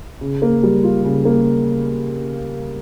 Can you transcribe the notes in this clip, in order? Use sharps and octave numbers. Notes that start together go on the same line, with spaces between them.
C#3
A#3
G3
F4
C#3
A#3